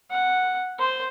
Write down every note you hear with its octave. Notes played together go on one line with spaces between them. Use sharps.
F#5
C5